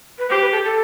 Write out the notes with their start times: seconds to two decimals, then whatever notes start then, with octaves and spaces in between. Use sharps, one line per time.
0.18 B4
0.30 G4 C5
0.41 B4
0.52 A4
0.64 A4